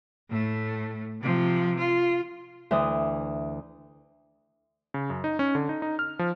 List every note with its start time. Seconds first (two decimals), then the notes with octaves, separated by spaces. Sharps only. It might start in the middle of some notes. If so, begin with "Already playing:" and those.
0.30 A2 A3
1.21 C3 F3
1.78 F4
2.71 D2 E3 D#6
4.94 C#3
5.10 F#2
5.24 D#4
5.39 C#4
5.55 D3
5.69 D#4
5.82 D#4
5.99 F6
6.19 F3